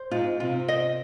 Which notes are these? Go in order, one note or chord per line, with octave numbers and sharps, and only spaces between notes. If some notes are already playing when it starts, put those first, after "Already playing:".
Already playing: C5
G#2 G#3 F4
C3 C4 F4
D#5